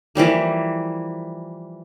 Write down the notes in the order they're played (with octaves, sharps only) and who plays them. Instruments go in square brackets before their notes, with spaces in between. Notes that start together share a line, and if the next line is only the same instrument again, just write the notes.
[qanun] E3 F3 G3 A#3